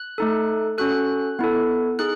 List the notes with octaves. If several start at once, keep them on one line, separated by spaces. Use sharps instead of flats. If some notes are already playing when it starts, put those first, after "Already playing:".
Already playing: F#6
A3 D#4 A4
C#4 F#4 A4 F#6
B3 E4 A4
D#4 G#4 F#6